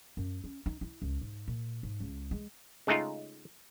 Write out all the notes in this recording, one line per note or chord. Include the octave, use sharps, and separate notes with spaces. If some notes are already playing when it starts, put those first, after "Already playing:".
F#2
C#4
D#4
E4
C#2
G#2
A#2
G#2
C#2
G#3
C#3 G#3 A3 D#4 F4